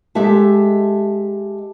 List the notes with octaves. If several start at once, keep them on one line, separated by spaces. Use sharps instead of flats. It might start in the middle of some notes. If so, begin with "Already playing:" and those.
G#3 G4 A4 E5 A5